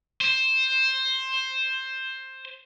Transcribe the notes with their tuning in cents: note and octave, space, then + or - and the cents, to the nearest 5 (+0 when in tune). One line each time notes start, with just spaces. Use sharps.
C5 +10